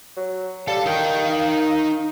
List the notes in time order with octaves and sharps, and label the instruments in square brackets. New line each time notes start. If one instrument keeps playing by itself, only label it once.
[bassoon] F#3
[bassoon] G3 [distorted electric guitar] A4 [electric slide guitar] F5
[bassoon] D#3 [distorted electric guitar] D#4 G5